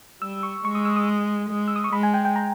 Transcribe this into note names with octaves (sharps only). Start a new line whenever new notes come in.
G3 E6
C#6
G#3 C#6
D#6
E6
D#6
G#3
E6
D#6
C#6
G#3 B5
G#5
G5
G5
A#5